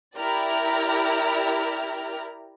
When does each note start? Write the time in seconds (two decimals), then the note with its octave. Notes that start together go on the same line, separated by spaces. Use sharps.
0.18 E4 G4 A#4 D5 A#5 F6